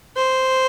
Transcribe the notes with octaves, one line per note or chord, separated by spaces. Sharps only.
C5